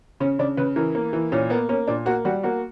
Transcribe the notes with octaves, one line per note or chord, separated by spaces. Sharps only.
C#3 C#4
C#3 D4
C#3 B4
E3 A#4
A#3
E3
A#2 C#4
A#3 B3
A#3 C#4
A#2 D4
A#3 F#4
G3 F#4
A#3 F#4